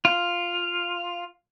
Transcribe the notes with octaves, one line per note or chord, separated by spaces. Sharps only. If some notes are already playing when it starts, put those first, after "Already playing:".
F4